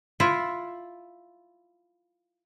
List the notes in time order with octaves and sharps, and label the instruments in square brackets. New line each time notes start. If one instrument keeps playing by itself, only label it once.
[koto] E4 F4